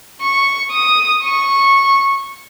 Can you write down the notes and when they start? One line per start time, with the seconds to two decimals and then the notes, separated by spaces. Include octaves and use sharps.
0.21 C#6
0.72 D#6
1.24 C#6